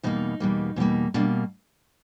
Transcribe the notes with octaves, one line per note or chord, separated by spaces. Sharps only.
E2 B2 G3 A#3 D#4
E2 B2 G3 A#3
E2 B2 G3 A#3
B2 G3 A#3 D4